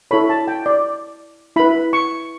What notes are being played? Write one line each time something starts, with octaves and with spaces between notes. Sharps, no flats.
E4 A4 C#5 B5
A5
G5
D5
E4 B4 B5
C#6